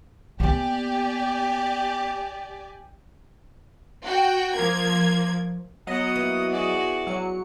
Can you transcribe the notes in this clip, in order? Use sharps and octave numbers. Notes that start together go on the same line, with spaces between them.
A#3 B3 G4 D5 G#5
F#4 G5
F3 A#3 G#6
F#3 B3 D#5 F#5 D#7
E3 A#3
F#4 G#4 D5
F#3 C#7